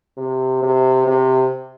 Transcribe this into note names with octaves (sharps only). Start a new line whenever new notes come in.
C3
C3
C3